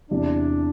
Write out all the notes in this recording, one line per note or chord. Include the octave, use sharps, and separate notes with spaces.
E2 C3 E3 D4